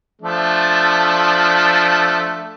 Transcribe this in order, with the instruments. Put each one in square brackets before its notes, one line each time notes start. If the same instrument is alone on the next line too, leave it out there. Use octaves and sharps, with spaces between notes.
[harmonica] F3 A3 D4